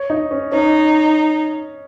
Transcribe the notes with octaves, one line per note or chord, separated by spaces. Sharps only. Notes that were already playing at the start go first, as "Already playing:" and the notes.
Already playing: C#5
D#4
C#4
C#4 D#4